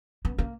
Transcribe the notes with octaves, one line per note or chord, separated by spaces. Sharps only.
B3
A#3